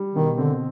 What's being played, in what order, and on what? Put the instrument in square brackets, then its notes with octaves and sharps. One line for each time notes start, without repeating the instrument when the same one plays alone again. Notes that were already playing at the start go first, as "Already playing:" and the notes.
Already playing: [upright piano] G3
[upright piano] B2 [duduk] D#3
[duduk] D3 [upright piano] C4